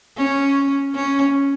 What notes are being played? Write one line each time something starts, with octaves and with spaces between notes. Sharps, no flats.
C#4
C#4